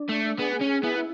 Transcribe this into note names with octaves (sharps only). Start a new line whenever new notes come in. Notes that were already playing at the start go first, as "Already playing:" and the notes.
Already playing: D4
A3
B3 G#4
C#4
B3 E4